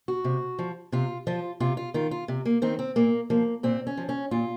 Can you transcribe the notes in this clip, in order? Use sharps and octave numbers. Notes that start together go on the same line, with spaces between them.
F#4
C3
F3
C3 F4
F3 F4
C3 F4
F4
D#3 F4
F4
C3
A#3
D#3 C4
C4
A#2 A#3
F3 A#3
A#2 C4
C#4
F3
C#4
A#2 F4